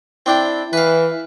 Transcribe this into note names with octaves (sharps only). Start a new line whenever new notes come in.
C4 D4 E4 G5
E3 B4 F5